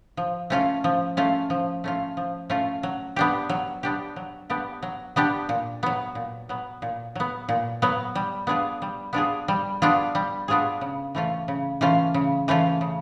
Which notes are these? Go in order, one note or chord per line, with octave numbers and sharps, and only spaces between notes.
F3
A3 C#4 F4
F3
A3 C#4 F4
F3
A3 C#4 F4
F3
A3 C#4 F4
F#3
B3 D4 G4
F#3
B3 D4 G4
F#3
B3 D4 G4
F#3
B3 D4 G4
A#2
F#3 B3
A#2
F#3 B3
A#2
F#3 B3
A#2
F#3 B3
G3
B3 D4 F4 G#4
G3
B3 D4 F4 G#4
G3
B3 D4 F4 G#4
G3
B3 D4 F4 G#4
C#3
E3 A3 C#4 F4
C#3
E3 A3 C#4 F4
C#3
E3 A3 C#4 F4
C#3